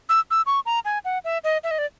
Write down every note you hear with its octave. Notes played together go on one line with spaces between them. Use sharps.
E6
E6
C#6
A#5
G#5
F#5
E5
D#5
E5
D#5
D5